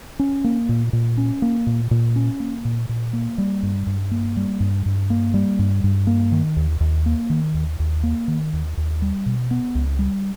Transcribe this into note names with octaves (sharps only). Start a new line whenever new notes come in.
C#4
A#3
A#2
A#2
C#4
A#3
A#2
A#2
C#4
A#3
A#2
A#2
A#3
G3
G2
G2
A#3
G3
G2
G2
A#3
G3
G2
G2
A#3
D#3
D#2
D#2
A#3
D#3
D#2
D#2
A#3
D#3
D#2
D#2
G3
B2
B3
C#2
G3